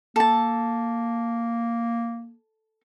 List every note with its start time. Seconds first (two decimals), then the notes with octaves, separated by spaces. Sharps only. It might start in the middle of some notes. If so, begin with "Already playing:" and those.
0.16 A#3 A4 A5